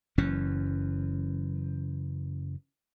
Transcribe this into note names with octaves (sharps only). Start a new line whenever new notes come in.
F#1 F#2 E3 C#4